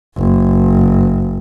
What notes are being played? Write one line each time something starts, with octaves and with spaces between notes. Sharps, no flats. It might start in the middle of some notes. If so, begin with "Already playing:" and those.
F#1